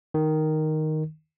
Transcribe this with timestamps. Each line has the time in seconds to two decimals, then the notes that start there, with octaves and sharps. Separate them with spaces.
0.14 D#3